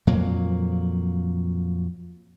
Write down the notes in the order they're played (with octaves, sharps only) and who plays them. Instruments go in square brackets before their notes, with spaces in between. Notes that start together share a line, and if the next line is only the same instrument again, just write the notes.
[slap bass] F2 A#2 F#3 A#3